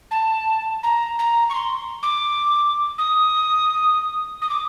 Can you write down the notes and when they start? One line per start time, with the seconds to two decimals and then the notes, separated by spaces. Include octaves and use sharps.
0.11 A5
0.83 A#5
1.19 A#5
1.50 C#6
1.55 C6
2.03 D6
2.98 D#6
4.42 D#6
4.49 D6